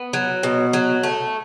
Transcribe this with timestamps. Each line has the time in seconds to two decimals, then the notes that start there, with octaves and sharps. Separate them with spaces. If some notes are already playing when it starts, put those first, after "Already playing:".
Already playing: B3
0.13 F#3
0.43 B2
0.73 F#3
1.03 A3